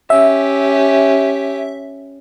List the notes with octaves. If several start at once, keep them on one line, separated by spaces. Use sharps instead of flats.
C#4 G4 E5